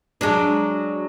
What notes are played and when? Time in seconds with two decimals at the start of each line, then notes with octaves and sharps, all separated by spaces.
0.21 F#3 G#3 D4